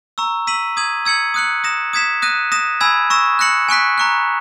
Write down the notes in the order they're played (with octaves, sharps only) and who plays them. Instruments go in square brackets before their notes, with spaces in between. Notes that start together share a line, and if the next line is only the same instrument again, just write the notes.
[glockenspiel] A#5 C#6 E6
E6 B6 D#7 F#7
D#6 G#6 D#7 F#7
E6 G#6 C#7 F#7
D#6 F#6 C#7 F#7
D#6 A#6 E7
D#6 G#6 B6 E7
D#6 F#6 A#6 D#7
D#6 A#6 E7
G#5 B5 E6 G#6
C#6 E6 A#6 E7
F#6 A#6 C#7 F#7
G#5 C#6 F#6 B6
A#5 C#6 F#6